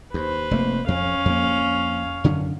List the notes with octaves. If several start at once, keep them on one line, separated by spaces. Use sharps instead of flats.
D#2 B4 C5
F1 A3 A#3
F2 C#4 F5
F2 A#3
F#2 D3 C#4